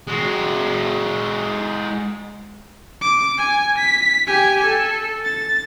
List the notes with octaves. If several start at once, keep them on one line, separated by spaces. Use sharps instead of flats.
G#3 F#4
D6
G#5
B6
G4 G#5
A4
A6